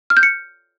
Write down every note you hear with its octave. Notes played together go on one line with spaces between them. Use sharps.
F6
G6
C#7